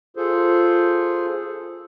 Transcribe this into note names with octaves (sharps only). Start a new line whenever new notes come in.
F4 G#4 A4 C5